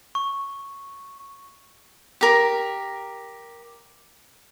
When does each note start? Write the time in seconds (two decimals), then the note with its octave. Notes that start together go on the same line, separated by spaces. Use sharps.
0.15 C#6
2.21 G4 A#4